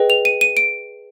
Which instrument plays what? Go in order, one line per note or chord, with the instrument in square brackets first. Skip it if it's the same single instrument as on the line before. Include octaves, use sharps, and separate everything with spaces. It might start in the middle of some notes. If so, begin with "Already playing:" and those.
Already playing: [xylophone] G#4 B4 D#5 G5
F7
D#7
D#7
D7